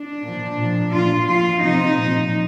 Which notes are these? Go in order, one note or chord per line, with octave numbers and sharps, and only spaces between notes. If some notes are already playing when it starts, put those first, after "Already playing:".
Already playing: D4
A#2 F3
A#2 F3
A#2 F3 F4
A#2 F3 F4
C3 F3 D#4
A#2 F3